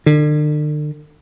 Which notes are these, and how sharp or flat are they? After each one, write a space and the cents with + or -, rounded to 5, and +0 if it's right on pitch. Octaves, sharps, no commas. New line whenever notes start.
D3 +40